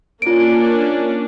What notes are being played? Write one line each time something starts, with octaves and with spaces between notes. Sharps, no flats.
A#3 C#4 D4 F4 D7